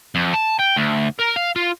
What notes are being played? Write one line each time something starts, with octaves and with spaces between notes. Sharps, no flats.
F2
A5
G5
D2
A#4
F5
F4